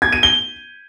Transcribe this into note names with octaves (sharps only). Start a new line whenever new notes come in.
G#6
D#7
G7